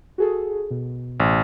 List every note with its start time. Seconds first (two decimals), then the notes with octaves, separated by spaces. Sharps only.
0.18 F#4 G#4 A4
0.71 B2
1.20 A1